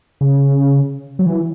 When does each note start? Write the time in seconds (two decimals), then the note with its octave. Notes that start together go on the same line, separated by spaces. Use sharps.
0.21 C#3
1.19 F#3
1.26 E3